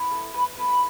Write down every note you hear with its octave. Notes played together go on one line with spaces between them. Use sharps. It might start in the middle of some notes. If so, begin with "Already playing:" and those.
Already playing: B3 E4
A4
B4
B3 E4 A4 B4
B5